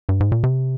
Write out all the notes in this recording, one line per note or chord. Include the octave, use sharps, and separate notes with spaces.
G2
G#2
A#2
C3